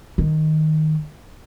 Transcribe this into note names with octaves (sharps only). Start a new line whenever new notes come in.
D#3